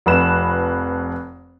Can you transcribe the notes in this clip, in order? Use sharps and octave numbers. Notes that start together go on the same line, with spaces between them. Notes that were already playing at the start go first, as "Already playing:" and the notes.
F1 F2 B4 E7